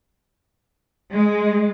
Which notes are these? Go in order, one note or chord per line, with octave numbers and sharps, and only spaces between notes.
G#3